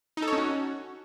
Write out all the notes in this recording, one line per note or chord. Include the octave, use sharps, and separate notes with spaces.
D#4
A4
C#5
C#4
F#4